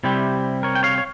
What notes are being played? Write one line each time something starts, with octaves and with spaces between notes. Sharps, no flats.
C3 G3 C4 E4 G4
A#4 C#5
G5
C#5 F5
C#5